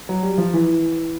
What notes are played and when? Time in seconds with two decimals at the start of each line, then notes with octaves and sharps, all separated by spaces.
0.09 F#3
0.23 G3
0.38 F3
0.53 E3